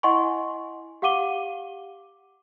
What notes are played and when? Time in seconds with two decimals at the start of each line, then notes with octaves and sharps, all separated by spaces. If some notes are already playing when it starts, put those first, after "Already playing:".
0.03 E4 D#5 F#5 G#5 C6 C#6
1.02 G4 F5 F#5 D6 D#7 G7